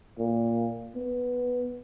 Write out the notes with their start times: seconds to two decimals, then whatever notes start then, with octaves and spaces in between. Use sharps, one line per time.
0.19 A#2
0.95 B3